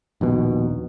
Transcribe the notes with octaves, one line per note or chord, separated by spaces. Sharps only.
A#1 D#2 B2